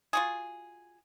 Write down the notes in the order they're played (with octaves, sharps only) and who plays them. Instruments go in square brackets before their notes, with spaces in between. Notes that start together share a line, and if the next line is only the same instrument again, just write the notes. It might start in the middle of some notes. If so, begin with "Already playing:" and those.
[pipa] F4 F#4 G#4